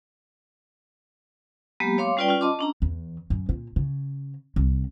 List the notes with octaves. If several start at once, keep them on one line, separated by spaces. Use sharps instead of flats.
F#3 G#3 A#3 B3 G4
C#5 F5 C6 D6
G3 C#4 F4 B4 D5 G5
C#4 F4
D#5 A5 C6 D6
C#4 D4 A#5
E2
F#2
A#2
C#3
C2